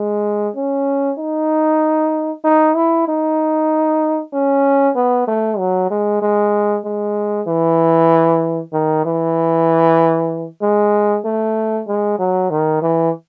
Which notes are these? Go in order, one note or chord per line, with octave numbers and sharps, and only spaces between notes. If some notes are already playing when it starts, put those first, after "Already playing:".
Already playing: G#3
C#4
D#4
D#4
E4
D#4
C#4
B3
A3
F#3
G#3
G#3
G#3
E3
D#3
E3
G#3
A3
G#3
F#3
D#3
E3